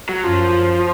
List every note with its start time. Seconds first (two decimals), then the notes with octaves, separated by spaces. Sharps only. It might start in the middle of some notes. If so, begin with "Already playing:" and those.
0.09 F#3
0.23 F#2 F3